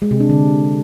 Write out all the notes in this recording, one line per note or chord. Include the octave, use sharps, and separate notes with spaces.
G#3
C3
D4
D3